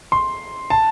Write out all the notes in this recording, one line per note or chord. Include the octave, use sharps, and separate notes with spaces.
C6
A5